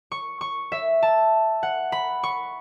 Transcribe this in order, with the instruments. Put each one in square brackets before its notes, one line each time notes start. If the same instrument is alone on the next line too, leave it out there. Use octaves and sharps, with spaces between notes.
[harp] C#6
C#6
E5
A5
F#5
B5
C#6